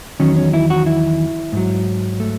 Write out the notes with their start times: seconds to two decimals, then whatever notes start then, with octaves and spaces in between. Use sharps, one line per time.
0.20 E2 D#3 F#3 C#4
0.37 C#4
0.53 E4
0.70 F#4
0.86 E4
1.52 G#2 F#3
2.20 A3